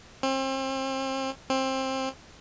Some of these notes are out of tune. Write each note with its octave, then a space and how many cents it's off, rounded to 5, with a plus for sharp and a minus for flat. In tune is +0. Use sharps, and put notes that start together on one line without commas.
C4 +35
C4 +20